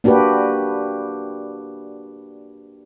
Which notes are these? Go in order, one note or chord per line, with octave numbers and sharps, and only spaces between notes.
A#3 D4 F#4 G4 B4